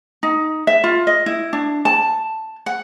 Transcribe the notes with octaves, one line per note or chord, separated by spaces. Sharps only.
D#4
E5
F4
D#5
E4
D4
A5
F#5